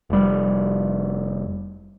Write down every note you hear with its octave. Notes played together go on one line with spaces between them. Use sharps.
F1 G3